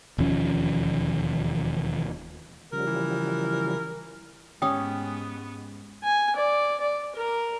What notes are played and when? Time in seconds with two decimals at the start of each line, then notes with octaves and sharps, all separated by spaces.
0.18 E1 D#2 F3 C#4
2.72 C#3 F3 G3 A#4
2.87 E3
4.62 G#2 B3 C#4 G4 G5 D#6
6.03 G#5
6.36 D5
6.80 D5
7.15 A#4